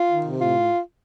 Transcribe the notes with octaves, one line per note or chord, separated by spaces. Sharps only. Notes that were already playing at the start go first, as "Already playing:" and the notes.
Already playing: F4
D#3
C3
A2 F4